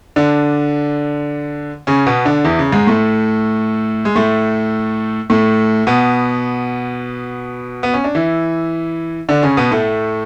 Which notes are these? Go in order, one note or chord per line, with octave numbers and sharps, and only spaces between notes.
D3 D4
C#3 C#4
B2 B3
D3 D4
E2 E3
C#3
G#2 G#3
A2 A3
G#3
A2 A3
A2 A3
B2 B3
B3
C#4
D4
E3 E4
D3 D4
C#3 C#4
B2 B3
A2 A3